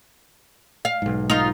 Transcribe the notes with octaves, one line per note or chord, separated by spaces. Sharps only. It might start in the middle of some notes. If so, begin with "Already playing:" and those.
F5
B1 G#2
D#4 F4